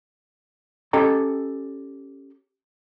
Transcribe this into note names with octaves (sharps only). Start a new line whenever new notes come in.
C#4 G4 A4 D#5 G5 A#5